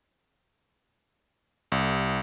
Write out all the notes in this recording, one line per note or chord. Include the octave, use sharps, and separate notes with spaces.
C2